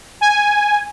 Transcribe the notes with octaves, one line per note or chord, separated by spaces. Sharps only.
G#5